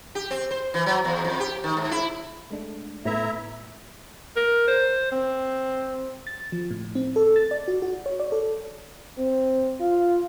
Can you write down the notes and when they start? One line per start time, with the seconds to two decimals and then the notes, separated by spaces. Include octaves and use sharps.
0.15 G4
0.31 C4
0.51 C5
0.74 E3
0.86 F#3
1.05 E2
1.25 F2
1.40 G4
1.64 D#3
1.77 G#2
1.91 E4
2.51 G#3 A3 D4
3.05 A2 A3 B3 E4 E5 A#5
4.36 A#4
4.68 C5
5.12 C4
6.27 A6
6.52 F3
6.71 A2
6.95 C4
7.16 A4
7.36 A6
7.51 D5
7.68 F#4
7.82 F#4
8.06 C#5
8.20 D5
8.32 A4
9.18 C4
9.80 F4